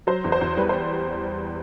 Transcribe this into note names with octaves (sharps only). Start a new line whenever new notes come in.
F#3 C5
E2
C5
E2
G3 B4
C5